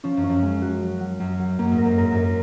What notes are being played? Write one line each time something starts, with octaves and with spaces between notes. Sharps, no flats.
F3 C#4
F#2
C#4
F#2
G#3
F#4
F#3
F#3
F#2 F#3
F#3
F#2 A#3
G#2
A#4
F#2
G#2 A#4
F#2
A#4